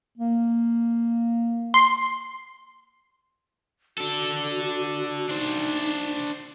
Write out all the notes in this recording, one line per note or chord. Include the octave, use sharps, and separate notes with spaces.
A#3
C6
D4 F#4 A4
D4 D#4 C5